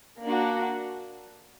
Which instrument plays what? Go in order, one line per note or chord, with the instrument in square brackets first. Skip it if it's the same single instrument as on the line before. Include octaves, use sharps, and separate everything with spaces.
[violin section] A#3 D4 F#4